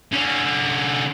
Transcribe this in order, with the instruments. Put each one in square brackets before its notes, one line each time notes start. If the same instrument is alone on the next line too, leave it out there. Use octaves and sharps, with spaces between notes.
[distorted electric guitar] D3 C#4